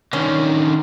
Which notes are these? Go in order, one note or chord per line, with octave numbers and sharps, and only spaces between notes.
D3 D#3 C#4